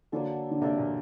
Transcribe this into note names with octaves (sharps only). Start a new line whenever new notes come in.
D3 F#3 A#3 D4 A4
D3
C3 A#3 D4 A4 D5
A#2